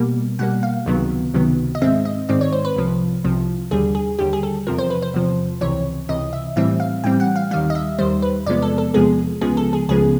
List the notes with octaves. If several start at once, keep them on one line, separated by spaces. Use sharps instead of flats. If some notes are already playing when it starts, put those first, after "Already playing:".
Already playing: B2 G3 A#3
B2 G3 A#3 F#5
F5
C#2 C3 D#3 F#3 B3
C#2 C3 D#3 F#3 B3
D#5
G#2 D#3 G#3 C4 E5
D#5
G#2 D#3 G#3 C4 D5
C#5
C5
B4
C2 C3 F3
C2 C3 F3
D#2 D3 G3 G#4
G#4
D#2 D3 G3 G4
G#4
A4
E2 C3 F3 A#4
C5
B4
C5
E2 C3 F3
C#2 C3 E3 C#5
C#2 C3 E3 D#5
E5
A2 E3 G3 C4 E5
F5
A2 E3 G3 C4 G5
F#5
F5
D#2 D#3 G3 F5
D#5
E5
D#2 D#3 G3 C5
B4
E2 C3 F3 G#3 B3 D5
A4
A4
E2 C3 F3 G#3 B3 G#4
C#2 C#3 F3 G#3 B3 G#4
A4
G#4
C#2 C#3 F3 G#3 B3 G#4